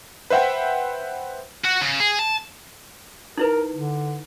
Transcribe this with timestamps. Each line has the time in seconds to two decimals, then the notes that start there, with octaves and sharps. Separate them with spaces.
0.30 B4 C5 E5 F#5 G5
1.65 F#4
1.82 C#3
2.00 G#4
2.19 A5
3.38 D#4 E4 A#4 B4
3.73 D3